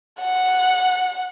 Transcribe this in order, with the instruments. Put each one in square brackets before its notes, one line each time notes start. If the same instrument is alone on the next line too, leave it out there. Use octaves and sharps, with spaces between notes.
[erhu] F#5